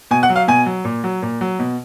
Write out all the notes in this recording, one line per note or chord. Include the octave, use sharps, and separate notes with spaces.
B2 G#5
F#5
F#3
F5
B2 G#5
F#3
A#2
F#3
A#2
F#3
B2